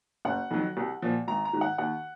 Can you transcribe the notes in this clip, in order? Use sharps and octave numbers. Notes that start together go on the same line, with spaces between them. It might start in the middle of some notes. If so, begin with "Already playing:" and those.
F#1 F#5
F2 D#3 F#3
C2
A#2 F3
G#1 A#5
A#5
G#2 D#3
F#5
D#2 F#5